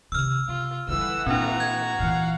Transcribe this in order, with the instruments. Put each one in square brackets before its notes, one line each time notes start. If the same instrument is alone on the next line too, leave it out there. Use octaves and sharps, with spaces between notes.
[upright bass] C3 D#3 [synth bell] E6 F6
[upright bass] C3 [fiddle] F4
[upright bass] D3 G3 [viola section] E3 A4 F#5 [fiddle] E6
[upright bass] A#2 [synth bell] C4 D4 [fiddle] F#4 A#5
[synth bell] G#6
[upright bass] A#2 E3 [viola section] F5 F#5